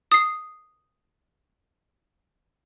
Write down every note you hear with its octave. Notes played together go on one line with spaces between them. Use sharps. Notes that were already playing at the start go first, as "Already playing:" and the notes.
D#6 C7